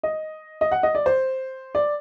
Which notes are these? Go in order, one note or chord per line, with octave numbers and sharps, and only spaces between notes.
D#5
D#5
F#5
D#5
D5
C5
D5